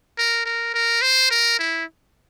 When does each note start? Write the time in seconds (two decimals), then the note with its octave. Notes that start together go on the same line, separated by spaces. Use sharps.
0.18 A#4
0.46 A#4
0.74 A#4
1.02 C5
1.31 A#4
1.59 E4